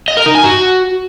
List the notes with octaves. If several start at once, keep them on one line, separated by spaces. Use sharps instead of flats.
D#5
A#4
D#4
G#5
F#4